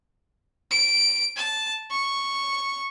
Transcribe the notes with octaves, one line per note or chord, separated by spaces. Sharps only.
D7
A5
C#6